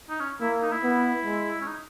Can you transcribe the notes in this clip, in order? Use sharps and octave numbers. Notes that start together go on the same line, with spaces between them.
D#4
C#4
A#3 E4
D#4
E4
B3
G#3
C#4
D#4